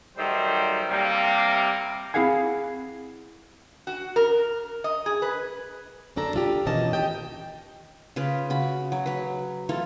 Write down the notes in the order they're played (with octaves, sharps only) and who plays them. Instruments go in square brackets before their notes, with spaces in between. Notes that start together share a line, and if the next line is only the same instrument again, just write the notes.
[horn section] D#3 F#3 G3 A3 C5
C3 G3 A#3
[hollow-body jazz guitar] C4 E4 G#4 F5 F#5 G#5
[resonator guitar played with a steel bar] F#4
A#4
D#5
G#4
B4
[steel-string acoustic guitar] F#2 D3 D4 A4 A#5
D4 F4 G4
B2 D#3 E3 C#4 D#5 A5
G4 D#5 G5
[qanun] C#3 F4 B4
C#3 F#4 B5
F#3
F#3 B4
E3 F4 A4